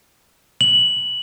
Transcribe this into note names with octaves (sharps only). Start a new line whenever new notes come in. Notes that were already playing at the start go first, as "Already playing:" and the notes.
F#7